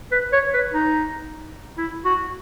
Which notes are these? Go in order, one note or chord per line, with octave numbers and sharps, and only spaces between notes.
B4
C#5
B4
D#4
E4
F#4